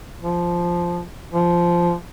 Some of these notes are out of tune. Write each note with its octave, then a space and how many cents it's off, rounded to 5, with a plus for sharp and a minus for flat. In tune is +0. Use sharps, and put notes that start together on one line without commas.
F3 -5
F3 -10